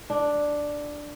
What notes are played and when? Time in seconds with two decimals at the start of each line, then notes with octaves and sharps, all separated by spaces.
0.10 D4